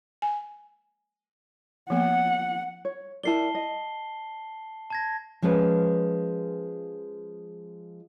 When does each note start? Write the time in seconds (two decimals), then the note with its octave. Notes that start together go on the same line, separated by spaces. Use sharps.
0.22 G#5
1.90 F3 A#3 B3 F#5
2.85 C#5
3.23 E4 A#4 D5 A5 C7 G7
3.55 D#5
4.90 A5 G#6 A#6
5.42 F3 G#3 C#4 B4